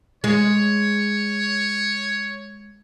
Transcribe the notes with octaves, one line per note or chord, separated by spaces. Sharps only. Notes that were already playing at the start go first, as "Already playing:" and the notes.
G#3 C#5